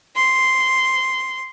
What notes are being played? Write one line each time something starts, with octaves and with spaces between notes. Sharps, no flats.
C6